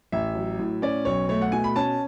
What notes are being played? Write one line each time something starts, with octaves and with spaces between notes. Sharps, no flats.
A1 E5
F#3
A2
C#4 D5
B1 C#5
A3 C#5
F#5
B2 G#5
B5
C#4 A5